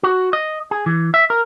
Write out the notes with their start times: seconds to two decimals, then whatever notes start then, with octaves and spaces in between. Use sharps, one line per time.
0.03 F#4
0.33 D#5
0.71 G#4
0.86 E3
1.14 E5
1.30 A#4